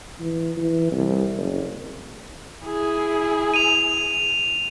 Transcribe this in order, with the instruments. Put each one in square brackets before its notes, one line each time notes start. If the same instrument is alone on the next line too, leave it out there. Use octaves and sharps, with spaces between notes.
[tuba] E3
E3
C2
F#1
[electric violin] E4 G#4
[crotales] D#7 F7